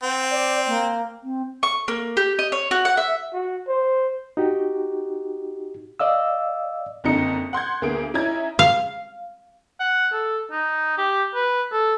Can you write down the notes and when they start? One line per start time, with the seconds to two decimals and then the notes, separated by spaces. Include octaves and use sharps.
0.03 C4 F#5
0.30 D5
0.67 A#3
1.23 C4
1.63 C#6
1.88 A#3
2.17 G4
2.39 D#5
2.52 C#5
2.71 F#4
2.85 F#5
2.97 E5
3.33 F#4
3.68 C5
4.37 D#4 F#4 G4
6.00 D5 D#5 F5 E6
7.04 F#1 F2 D3 D#4 C#7
7.53 F#5 C6 G6 G#6
7.82 D2 A#3 B3 G#4 D7
8.14 C#4 D#4 E4 E5 A#5 G#6
8.59 F5
9.80 F#5
10.13 A4
10.52 D#4
10.98 G4
11.35 B4
11.72 A4